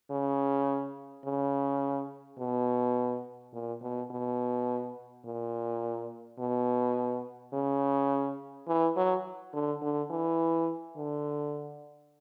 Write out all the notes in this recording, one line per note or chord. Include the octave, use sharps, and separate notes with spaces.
C#3
C#3
B2
A#2
B2
B2
A#2
B2
C#3
E3
F#3
D3
D3
E3
D3